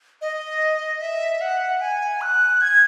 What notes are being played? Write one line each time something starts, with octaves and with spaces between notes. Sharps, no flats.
D#5
E5
F#5
G#5
F#6
G#6